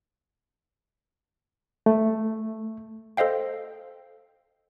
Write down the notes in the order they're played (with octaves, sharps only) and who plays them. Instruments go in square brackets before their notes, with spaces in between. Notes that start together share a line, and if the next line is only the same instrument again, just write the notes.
[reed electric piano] A3
[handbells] A4 C5 D#5 F5 G5